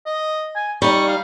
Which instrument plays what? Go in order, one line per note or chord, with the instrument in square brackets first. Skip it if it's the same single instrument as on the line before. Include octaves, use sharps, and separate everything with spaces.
[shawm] D#5
G#5
[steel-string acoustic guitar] G3 D#4 [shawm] C#6
[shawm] F5